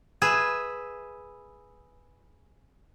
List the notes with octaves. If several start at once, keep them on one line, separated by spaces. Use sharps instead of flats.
G#4 B4 E5